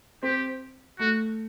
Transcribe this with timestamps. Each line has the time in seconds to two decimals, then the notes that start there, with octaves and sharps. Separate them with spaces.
0.23 C4 G4
0.99 A3 F#4